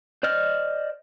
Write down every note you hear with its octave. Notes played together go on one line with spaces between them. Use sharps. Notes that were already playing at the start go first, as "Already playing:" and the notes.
C5 D5 D#5 F6